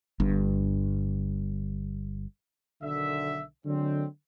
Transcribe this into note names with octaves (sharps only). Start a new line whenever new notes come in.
G1 G2
B1 D3 D#3 E5
D3 F#3 G#3 C4